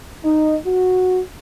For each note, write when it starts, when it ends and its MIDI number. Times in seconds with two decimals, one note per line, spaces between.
0.24 0.56 63
0.65 1.20 66